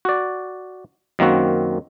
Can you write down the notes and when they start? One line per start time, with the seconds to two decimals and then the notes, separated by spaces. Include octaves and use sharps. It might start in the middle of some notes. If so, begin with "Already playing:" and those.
0.05 F#4 D5
1.19 F#2 D#3 A#3 C4 F#4